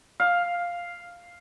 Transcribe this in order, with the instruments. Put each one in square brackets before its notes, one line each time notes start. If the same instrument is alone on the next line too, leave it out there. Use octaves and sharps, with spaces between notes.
[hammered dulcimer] F5